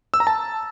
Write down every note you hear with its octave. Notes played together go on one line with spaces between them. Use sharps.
E6
A#5
A5